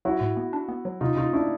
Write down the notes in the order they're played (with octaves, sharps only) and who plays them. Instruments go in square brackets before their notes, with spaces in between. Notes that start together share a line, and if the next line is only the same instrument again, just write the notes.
[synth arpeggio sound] F#3 [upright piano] E4 F#4
[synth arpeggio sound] A2
B3
D4
B3
F#3
[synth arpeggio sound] C3 [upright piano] D#4 F4
[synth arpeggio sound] C3 [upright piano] D#4 F4
[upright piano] D4 E4